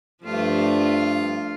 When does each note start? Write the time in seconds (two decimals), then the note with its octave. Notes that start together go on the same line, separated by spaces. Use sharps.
0.24 G2 F3 A3 D4 F4